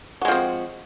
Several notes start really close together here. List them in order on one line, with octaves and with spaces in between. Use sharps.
F#4 G#3 F3 C4